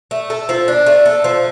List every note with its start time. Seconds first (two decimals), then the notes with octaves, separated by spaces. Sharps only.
0.11 A3
0.30 A4
0.49 F3
0.68 D4
0.86 A3
1.06 A4
1.24 F3